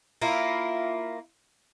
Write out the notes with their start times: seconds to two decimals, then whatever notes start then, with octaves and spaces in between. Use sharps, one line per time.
0.22 A#3 E4 F4